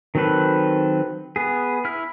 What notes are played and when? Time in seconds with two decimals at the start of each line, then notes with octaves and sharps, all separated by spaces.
0.15 D#3 F#3 C4 A4 B4
1.36 B3 G#4
1.85 E4 F6